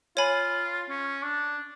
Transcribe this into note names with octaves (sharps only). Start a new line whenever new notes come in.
F4 C#5 G#5 B5
C#4
D4